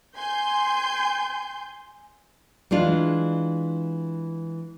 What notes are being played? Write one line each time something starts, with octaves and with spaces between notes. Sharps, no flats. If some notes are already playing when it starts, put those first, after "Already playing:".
G#5 C6 G6
E3 G#3 D4 F4